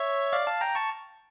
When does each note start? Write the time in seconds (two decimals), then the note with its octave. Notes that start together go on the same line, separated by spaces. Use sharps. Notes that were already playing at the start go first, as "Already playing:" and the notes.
Already playing: C#5 E5
0.33 D5 F5
0.47 F5 A5
0.61 G5 A#5
0.75 A5 C#6